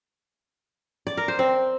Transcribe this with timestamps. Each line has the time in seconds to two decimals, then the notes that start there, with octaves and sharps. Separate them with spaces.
1.07 D5
1.17 A#4
1.28 C5
1.39 C4